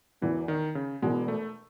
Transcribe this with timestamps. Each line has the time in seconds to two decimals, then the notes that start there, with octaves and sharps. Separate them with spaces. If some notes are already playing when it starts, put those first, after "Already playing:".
0.22 E1 E2 B2 E3
0.48 D#3
0.75 C#3
1.02 E1 E2 B2 G#3
1.28 A3